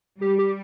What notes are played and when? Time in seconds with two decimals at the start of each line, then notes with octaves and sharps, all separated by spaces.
0.21 G3 G4
0.38 G4